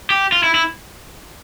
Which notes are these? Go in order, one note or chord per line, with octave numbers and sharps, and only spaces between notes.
G4
F4
E4
E4